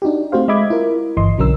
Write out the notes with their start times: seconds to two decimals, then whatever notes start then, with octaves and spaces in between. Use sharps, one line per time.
0.02 D4 D#4 F#4 G4
0.32 A3 C4 F#4 G4 C5 F5
0.48 G#3 D#5 E5 B5 D6 G#6
0.70 E4 F4 A#4
1.17 G1 E3 D#5 C6
1.38 B1 D3 F#3 C#4 A#4 E6